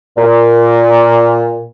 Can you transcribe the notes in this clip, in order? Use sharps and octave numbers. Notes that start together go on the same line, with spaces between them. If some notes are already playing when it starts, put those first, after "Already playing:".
A#2